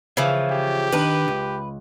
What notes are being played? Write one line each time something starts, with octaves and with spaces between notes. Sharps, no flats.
C#3 E3 F3 E5
G4
D#3 D4 D#4 B4
C#2